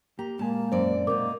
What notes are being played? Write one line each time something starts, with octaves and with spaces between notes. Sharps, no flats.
A#3 G4 A#5
A#2 G#3 A#3 G#5 A5
F#2 C4 C5 D5
B2 A#3 D#4 A#4 D6